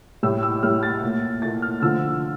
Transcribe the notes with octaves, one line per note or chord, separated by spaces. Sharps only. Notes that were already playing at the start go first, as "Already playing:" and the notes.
A2 G3 E6
E6
A2 G3 F6
A6
A#2 A3
A#2 A3 A6
F6
D3 F3 A3 E6